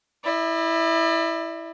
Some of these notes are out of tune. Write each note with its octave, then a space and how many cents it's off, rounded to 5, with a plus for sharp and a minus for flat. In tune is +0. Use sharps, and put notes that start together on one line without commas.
E4 -5 D5 +40